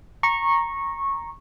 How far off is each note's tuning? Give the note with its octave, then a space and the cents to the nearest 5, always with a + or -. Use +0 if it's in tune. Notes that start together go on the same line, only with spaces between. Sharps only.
A#5 +0 C#6 -15